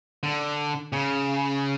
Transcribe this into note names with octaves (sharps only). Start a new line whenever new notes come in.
D3
C#3